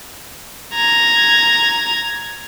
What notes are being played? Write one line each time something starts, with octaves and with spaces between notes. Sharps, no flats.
A#5 G#6